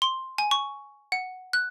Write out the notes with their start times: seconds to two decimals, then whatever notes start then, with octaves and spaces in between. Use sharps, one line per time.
0.02 C6
0.38 G#5
0.51 C#6
1.12 F#5
1.53 F#6